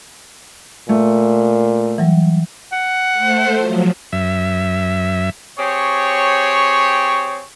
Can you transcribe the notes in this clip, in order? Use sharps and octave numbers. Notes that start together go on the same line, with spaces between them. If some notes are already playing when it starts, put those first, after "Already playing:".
A#2 A3
E3 F#3 G3
F#5
A3 C5
F3 F#3
F#2 E5
C4 G4 G#4 C#5